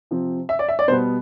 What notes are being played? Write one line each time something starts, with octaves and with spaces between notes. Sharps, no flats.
C3 F3 C4
E5
D5
E5
D5
B2 G3 B3 C5